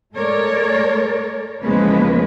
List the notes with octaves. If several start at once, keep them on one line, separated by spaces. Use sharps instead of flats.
G#3 A3 A4 A#4 C#5 D5
E2 C#3 F3 G#3 A#3 B4